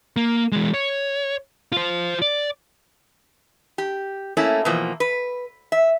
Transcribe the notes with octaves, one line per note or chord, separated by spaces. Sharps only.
A#3
E3 G#3
C#5
F4 C5
D5
G4
A3 A#3 C#4 E4
B2 E3 F3 A#3
B4
E5